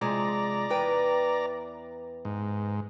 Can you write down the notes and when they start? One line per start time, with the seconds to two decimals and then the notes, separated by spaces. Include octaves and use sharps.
0.01 C3 F3 G#3 D5 A#5
0.70 E2 B4 G5
2.25 G#2